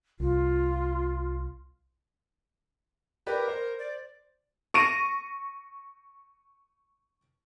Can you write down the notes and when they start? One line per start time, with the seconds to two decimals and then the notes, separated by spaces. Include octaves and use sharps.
0.20 C2 F4
3.27 G4 A#4 B4 D5
3.48 C5
3.79 D5
4.74 C#6 A#6 D#7